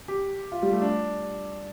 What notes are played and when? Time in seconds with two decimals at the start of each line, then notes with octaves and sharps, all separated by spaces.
0.08 G4
0.52 F4
0.63 G3
0.72 A3
0.81 D4